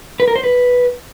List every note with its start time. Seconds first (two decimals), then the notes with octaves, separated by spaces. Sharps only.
0.20 B4
0.28 A#4
0.36 C5
0.43 B4